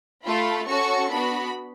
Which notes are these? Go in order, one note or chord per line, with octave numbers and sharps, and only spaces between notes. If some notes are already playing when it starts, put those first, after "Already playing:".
A3 F4 A4 B5
C#4 F#4 A4 C#6
B3 D4 F#4 B5